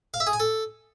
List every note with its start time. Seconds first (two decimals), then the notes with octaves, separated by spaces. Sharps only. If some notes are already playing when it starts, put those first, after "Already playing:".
0.14 F5
0.20 E5
0.27 G#4
0.33 G#5
0.40 A4